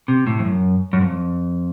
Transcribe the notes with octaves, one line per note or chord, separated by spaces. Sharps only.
C3
A2
F2
F#2
F#2
F2